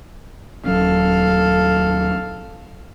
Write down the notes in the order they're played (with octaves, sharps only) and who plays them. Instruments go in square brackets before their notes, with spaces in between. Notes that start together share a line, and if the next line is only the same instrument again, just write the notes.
[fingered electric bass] D#1 F#3 C#4 [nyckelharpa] A4 F5